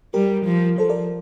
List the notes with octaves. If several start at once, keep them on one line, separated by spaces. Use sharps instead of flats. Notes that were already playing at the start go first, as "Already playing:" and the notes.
G3 G4 A#4
F3
F3 A4 C5
A#4 D5